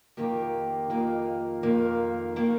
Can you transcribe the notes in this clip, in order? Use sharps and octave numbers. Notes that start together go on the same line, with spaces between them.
F2 D#3 A#3 G4
F2 D#3 A#3
F2 D#3 A#3
D#3 A#3